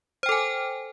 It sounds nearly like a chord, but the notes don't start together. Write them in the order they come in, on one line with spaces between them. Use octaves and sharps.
C5 G5 A4 G#5